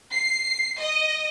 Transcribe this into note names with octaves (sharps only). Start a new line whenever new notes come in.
C7
D#5